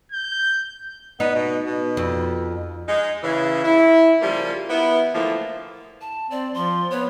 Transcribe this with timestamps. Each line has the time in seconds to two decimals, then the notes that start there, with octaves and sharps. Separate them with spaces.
0.12 G6
1.20 B3 D#4
1.35 B2
1.66 B2
1.97 F2
2.87 G#3 D#4
3.23 C#3 E3
3.64 E4
4.22 C#3 F3 G3 A#3
4.69 B3 E4
5.14 A2 D3 E3 F3 A3 A#3
6.01 A5
6.31 C4 D5
6.54 F3 C6
6.91 B3 C#5